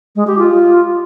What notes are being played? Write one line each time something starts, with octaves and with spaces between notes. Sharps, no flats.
G#3
G4
F4